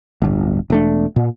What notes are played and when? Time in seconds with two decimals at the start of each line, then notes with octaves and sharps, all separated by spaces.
0.22 D1 G1
0.70 E1 A3 D4
1.16 A#2